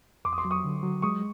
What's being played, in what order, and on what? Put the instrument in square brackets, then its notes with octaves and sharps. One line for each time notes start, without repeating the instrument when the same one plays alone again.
[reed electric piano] F2 [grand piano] C6 D6
[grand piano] D#6
C6 D6
[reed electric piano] F#3
[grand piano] C#6 D#6
[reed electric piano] D3
F#3
[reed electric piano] G#3 [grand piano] C#6 D#6